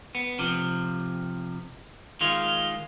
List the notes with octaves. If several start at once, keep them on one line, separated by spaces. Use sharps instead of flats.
B3
C3 F3
D#3 G#3 F4